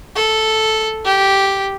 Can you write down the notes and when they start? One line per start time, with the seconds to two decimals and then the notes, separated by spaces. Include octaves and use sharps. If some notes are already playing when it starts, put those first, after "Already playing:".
0.16 A4
1.05 G4